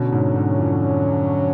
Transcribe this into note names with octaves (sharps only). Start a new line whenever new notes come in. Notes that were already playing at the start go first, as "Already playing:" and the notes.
Already playing: B2 D3 F#3 C#4
G#2
G#2
F2